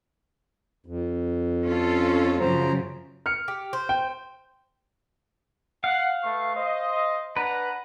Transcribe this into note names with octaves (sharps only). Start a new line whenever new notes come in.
F2
C#4 F4 A4
F#2 C#3 F3 F#3 C5 A#5
F6 C#7
G4
C5
G5
F5 F#5
A3 B4 C#6
C5 D#5
D4 B4 F#5 A#5